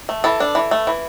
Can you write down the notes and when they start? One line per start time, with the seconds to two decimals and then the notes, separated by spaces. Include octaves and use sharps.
0.09 A3
0.24 E3 A4
0.40 D4
0.55 E3
0.71 A3
0.87 E3